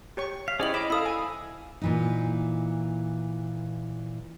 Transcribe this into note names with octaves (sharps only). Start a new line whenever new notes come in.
G4 C#5 C#6
F5 B6
C#4 E4 G4 G#4 C5 D5 D#5 F#7
D#5 B5 D6 E7
E4 A4 F5 B5 D#6 E6
G#5
A#2 E3 D#4